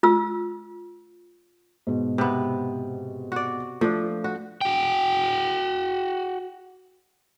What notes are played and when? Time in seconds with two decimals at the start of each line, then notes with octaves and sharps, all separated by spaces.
0.03 F4 E6
1.87 G#2 B2
2.18 C3 B3
3.32 F#4 D5
3.81 F3 A3 D4
4.24 F#4
4.61 F#4 G5